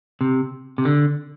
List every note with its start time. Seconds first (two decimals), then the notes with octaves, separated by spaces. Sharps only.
0.21 C3
0.78 C3
0.85 D3